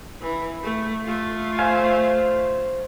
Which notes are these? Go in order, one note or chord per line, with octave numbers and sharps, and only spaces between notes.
E3
A3
A3 F4
C5 F5 G#5